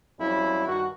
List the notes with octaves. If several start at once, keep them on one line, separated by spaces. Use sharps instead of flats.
F2 F#3 G3 C#4 E4
G2 D#3 F#4